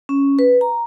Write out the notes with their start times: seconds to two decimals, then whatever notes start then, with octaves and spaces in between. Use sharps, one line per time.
0.09 C#4
0.39 B4
0.61 A#5